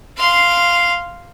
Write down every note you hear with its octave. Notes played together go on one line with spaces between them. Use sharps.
F5 C6